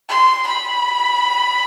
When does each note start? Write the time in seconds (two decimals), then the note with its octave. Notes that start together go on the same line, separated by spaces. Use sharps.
0.09 C6
0.47 B5